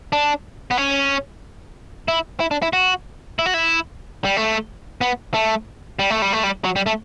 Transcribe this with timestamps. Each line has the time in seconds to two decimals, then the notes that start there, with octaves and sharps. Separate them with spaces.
0.13 D4
0.71 B3
0.77 C#4
2.08 E4
2.40 E4
2.51 D4
2.62 E4
2.73 F#4
3.39 E4
3.46 F#4
3.54 E4
4.25 G3
4.37 A3
5.01 B3
5.34 A3
5.99 G3
6.10 A3
6.22 G3
6.33 A3
6.43 G3
6.64 F#3
6.76 G3
6.86 A3